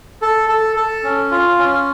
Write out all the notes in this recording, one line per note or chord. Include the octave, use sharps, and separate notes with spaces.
A4
A4
A4
C#4
F4
C#4